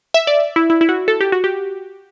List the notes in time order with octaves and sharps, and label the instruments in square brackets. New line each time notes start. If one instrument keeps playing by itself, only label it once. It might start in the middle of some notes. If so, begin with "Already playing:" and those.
[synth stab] E5
D5
E4
E4
E4
F#4
A4
G4
F#4
G4